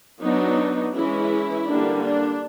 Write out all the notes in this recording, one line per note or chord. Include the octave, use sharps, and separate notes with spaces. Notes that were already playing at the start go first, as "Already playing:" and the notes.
F#3 B3 D4 D#4
E3 G#3 C#4 E4
D3 G3 A#3 D4
D4